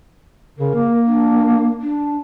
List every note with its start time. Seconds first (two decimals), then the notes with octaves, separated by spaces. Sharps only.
0.59 C#3 A#4
0.75 A#3
1.06 D4
1.81 D4